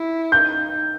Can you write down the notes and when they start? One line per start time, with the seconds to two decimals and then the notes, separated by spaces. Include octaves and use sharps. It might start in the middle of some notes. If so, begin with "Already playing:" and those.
Already playing: E4
0.32 D#4 G6